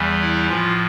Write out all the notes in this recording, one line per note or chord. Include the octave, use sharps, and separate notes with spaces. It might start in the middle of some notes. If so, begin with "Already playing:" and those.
Already playing: E2 E3 G3
E4
A2 F3 F4